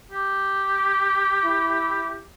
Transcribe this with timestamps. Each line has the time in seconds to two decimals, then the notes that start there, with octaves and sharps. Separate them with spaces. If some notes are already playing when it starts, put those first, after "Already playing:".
0.11 G4
1.44 E4